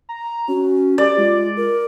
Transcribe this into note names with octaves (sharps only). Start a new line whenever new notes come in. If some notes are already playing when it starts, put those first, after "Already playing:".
A#5
C#4 F#4
G4 D5
G#3 F4
A#4